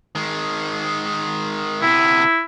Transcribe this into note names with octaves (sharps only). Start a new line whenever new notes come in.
D#3 G#3
C3 B3 E4